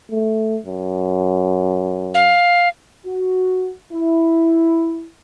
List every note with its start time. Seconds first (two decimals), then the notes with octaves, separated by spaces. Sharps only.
0.11 A3
0.66 F#2
2.14 F5
3.06 F#4
3.92 E4